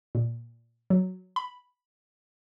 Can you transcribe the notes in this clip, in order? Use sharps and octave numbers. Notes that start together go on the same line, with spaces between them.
A#2
F#3
B5